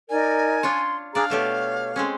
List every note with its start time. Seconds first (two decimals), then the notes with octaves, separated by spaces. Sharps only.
0.10 D#4 A#4 D5 G#5
0.63 D4 F4 C#5 C6
1.15 D4 G#4 D5 F5 A#5
1.30 B2 A3 G4 C#5
1.96 G#3 C4 C#4